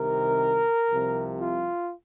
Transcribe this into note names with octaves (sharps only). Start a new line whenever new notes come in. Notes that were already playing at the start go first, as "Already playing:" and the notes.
Already playing: C2 C3 D#3 A#4
C2 C3 F3
F4